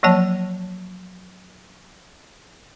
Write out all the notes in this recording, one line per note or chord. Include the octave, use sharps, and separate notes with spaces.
F3 F#3 A#3 C#5 A5